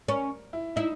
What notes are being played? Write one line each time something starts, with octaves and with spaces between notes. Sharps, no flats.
C#4 A#4
E4
D#4 E4